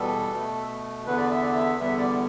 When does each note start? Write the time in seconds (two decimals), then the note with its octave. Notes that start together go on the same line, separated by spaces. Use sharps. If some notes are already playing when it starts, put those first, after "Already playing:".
Already playing: E2 B2 G3 B3 A4
0.33 B2 A3
1.06 E2 D3 B3 B4
1.18 D5
1.31 E5
1.42 D5
1.53 E5
1.80 E2 D3 G3 B3 E5
1.98 D5